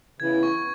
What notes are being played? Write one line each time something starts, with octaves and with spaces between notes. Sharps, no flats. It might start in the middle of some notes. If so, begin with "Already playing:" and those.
C#3 E3 B3 E4 G#6
C#6